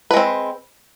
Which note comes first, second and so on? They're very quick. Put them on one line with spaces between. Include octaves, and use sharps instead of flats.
B4 G#3 C4